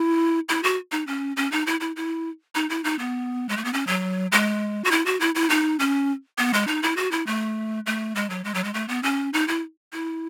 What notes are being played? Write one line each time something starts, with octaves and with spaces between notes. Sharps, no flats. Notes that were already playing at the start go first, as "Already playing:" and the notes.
Already playing: E4
E4
F#4
D#4
C#4
C#4
D#4
E4
E4
E4
D#4
E4
D#4
B3
G#3
A3
B3
C#4
F#3
G#3
F#4
E4
F#4
E4
E4
D#4
C#4
B3
G#3
D#4
E4
F#4
E4
A3
A3
G#3
F#3
G#3
F#3
G#3
A3
B3
C#4
D#4
E4
E4